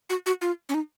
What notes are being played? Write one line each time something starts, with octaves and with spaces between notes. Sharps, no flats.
F#4
F#4
F4
C#4
D#4